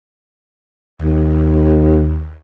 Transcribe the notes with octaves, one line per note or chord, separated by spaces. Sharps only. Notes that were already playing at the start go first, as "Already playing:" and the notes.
D#2